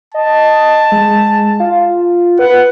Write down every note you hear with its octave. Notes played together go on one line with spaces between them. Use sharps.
D#5 A5
G#3
F4
B4 F#5